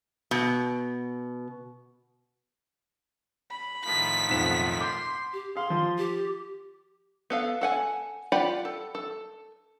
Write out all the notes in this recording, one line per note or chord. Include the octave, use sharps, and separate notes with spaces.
B2
B5
A2 D#3 F3 B6
B1 F2 F#5 E7
C6 D6 G6 B6
G4
G#4 F5 C6
F3
G4
B3 A4 F5
A4 F#5 G#5
F4 G4 D5 F#5 B5
A4
A4